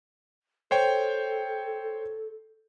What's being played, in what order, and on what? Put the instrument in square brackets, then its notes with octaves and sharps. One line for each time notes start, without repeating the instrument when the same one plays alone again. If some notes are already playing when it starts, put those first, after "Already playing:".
[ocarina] A4 [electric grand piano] C5 C#5 G5